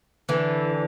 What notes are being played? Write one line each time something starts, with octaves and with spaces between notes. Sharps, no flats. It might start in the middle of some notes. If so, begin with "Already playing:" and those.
D3 E3